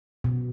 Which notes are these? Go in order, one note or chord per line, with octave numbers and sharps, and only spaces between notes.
B2